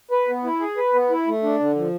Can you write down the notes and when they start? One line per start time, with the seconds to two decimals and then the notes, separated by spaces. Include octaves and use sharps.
0.11 B4
0.28 B3
0.44 E4
0.60 G#4
0.77 B4
0.94 B3
1.10 E4
1.27 A3
1.43 D4
1.59 D3
1.76 F3